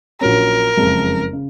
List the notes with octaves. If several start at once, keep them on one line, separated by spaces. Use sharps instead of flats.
A#1 A#2 F#3 C#4 A#4
F#1 F2 C#3 F3 G#3
C#3